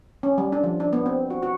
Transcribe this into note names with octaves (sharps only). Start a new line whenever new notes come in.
C#4
G3
D4
F3
D4
B3
C4
F#4
F#4